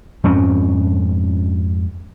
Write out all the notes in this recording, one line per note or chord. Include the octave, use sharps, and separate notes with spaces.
F2 G#2 C4 C#4